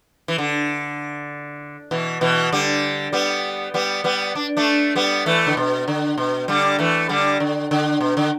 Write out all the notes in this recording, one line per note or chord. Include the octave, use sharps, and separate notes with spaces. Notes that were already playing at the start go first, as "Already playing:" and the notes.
E3
D3
B2 E3
B2 E3
D3 G3
G3 B3
G3 B3
G3 B3
D4
A3 D4
G3 B3
E3 A3
D3
B2
D3
B2
D3 G3
E3 A3
D3 G3
D3
D3
B2
D3